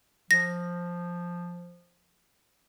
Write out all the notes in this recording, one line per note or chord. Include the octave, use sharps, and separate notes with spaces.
F3 A#6